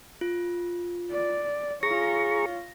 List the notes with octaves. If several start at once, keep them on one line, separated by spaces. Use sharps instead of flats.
F4
D5
F4 G#4 C#5 A#5 C#6 A#6